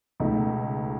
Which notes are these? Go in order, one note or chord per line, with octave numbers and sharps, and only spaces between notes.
C#2 B2 A3 D#4